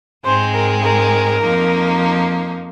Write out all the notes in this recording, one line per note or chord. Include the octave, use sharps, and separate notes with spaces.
G#2 G#3 C4 C5
A#4
A#4
F2 F3 A#3 D#4